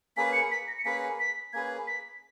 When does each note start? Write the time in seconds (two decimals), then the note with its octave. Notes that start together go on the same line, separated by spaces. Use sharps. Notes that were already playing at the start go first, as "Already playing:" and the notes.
0.17 A#3 C#4 G#4 B4 B6
0.33 C#7
0.51 B6
0.68 A#6
0.78 C#7
0.85 A#3 C#4 G#4 B4 B6
1.20 B6
1.53 A#3 C#4 G#4 B4 G#6
1.87 B6